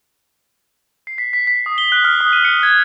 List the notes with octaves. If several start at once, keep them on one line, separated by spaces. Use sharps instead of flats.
C7
B6
B6
B6
D#6
G7
F#6
F6
D#6
D#7
C#7
G#6